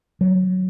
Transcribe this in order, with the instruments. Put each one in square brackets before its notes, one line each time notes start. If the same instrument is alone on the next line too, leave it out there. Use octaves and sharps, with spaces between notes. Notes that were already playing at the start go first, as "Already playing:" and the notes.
[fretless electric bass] F#3